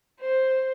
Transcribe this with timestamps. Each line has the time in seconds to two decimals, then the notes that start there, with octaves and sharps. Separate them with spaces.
0.20 C5